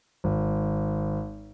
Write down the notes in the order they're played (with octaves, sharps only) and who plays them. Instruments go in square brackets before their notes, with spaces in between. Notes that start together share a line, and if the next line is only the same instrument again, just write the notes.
[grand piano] G#1